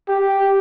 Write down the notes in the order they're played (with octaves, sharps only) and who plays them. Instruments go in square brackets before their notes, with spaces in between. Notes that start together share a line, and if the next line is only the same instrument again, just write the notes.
[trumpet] G4